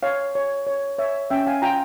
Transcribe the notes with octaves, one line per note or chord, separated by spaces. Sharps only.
C#5 F5
C#5
C#5
C#5 E5
C#4 E5 G5
F5 G#5
F4 G5 A#5